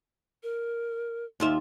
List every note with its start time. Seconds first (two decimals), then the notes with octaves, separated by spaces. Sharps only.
0.43 A#4
1.40 D#2 F4 E5